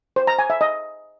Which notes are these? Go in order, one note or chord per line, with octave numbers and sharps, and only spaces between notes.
C5
A#5
G#5
E5
D#5